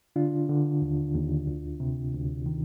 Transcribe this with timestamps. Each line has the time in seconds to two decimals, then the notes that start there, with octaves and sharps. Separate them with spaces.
0.16 D3 D4 F4
0.49 D3
0.82 D#2
1.15 D#2
1.47 D2
1.80 C3
2.13 D2
2.46 D#3